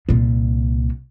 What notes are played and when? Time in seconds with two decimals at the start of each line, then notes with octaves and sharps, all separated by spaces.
0.09 C2 A#2